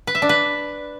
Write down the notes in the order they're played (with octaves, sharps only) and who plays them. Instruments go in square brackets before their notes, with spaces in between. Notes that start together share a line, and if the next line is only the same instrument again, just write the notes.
[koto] B4
E5
D4
B4